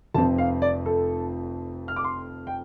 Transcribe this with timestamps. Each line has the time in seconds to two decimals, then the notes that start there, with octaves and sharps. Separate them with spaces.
0.14 F1 F2 F3 C4 A5
0.38 F5
0.62 D5
0.86 A4
1.88 F6
1.96 D6
2.04 C6
2.47 G5